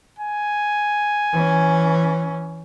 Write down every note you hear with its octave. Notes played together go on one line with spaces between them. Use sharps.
G#5
E3 C#4